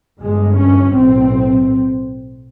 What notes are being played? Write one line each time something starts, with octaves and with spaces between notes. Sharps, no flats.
G1 G2 G#3
C#4
B1 A2 C4